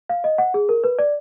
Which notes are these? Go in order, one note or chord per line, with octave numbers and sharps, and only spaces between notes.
F5
D#5
F#5
G#4
A#4
B4
D5